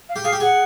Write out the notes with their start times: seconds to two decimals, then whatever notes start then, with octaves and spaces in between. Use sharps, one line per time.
0.09 F5
0.16 G4
0.24 G#4 F5
0.33 G4
0.40 G#4 F#5